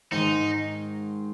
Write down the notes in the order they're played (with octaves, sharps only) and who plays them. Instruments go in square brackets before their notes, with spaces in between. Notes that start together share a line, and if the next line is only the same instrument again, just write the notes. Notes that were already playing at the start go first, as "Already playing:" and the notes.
[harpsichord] G#2 D#3 G#3 [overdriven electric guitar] D#4